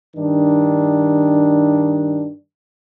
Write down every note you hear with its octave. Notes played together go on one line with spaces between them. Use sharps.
G2 D#3 D4